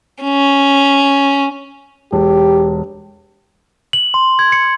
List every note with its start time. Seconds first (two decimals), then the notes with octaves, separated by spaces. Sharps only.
0.23 C#4
2.12 E1 G4
3.93 F#7
4.14 C6
4.39 G#6
4.52 C#7